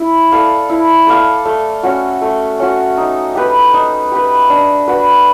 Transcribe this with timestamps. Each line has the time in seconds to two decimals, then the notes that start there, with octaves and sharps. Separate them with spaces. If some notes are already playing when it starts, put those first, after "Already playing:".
Already playing: E4
0.32 A4 D5 F5
0.70 E4
1.07 A4 D5 F5
1.45 A3
1.83 C#4 F#4
2.21 A3
2.60 C#4 F#4
2.97 D#4
3.35 G4 B4
3.74 D#4
4.12 G4 B4
4.50 D4
4.88 F#4 B4